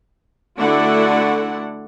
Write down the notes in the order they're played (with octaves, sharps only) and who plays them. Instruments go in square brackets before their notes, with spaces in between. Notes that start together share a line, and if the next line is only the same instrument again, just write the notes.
[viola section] D3 A3 D4 E4 F#4 F#5